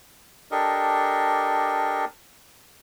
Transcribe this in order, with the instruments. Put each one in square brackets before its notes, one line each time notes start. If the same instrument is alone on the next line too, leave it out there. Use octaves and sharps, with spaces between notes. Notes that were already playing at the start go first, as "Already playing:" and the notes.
[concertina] D4 G4 A4 A#4 D#5